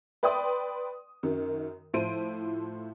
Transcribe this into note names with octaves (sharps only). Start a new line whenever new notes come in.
B4 D5 G5 C6 D#6
F#2 D#3
A2 F3 E4 C5 D7 D#7